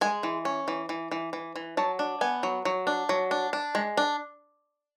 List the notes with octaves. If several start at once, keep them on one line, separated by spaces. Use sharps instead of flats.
G#3 G#5
E3
C#4
E3
E3
E3
E3
E3
F#3 A5
D4
B3 G#5
F#3
F#3
D4
F#3
D4
D4
G#3
D4